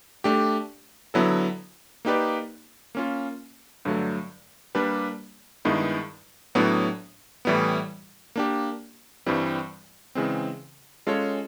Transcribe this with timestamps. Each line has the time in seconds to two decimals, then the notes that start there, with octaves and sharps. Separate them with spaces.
0.24 A3 D4 G4
1.14 D3 F#3 B3 E4 A4
2.05 A#3 D#4 G4 B4 D5
2.95 A#3 C#4 F4
3.85 G2 D3 F#3 A3
4.75 G3 A#3 D4 G4 B4
5.65 G2 D#3 G#3 B3 E4
6.55 A2 F#3 B3 D4
7.45 A2 E3 G3 B3
8.36 A#3 D4 G4
9.26 G2 E3 G3 C4
10.15 C#3 E3 G#3 C4
11.07 G#3 C#4 F4 A4 C#5